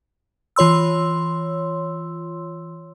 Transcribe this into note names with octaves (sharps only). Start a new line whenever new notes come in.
E3 F4 C#5 C6 E6